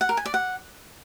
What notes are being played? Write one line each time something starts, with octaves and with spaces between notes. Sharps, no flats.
F#5
A#4
G#5
D5
F#5